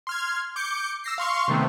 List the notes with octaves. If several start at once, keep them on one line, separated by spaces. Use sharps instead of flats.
C6 F6 G#6
D6 G6 C#7
E6 A#6 C7
F5 C6 C#6
C3 D#3 A3 B3 C4